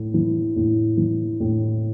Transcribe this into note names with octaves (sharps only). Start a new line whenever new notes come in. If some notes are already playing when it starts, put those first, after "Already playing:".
Already playing: A2
E3
A2
E3
A2